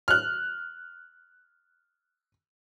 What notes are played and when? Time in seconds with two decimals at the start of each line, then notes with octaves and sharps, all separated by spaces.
0.08 F6 F#6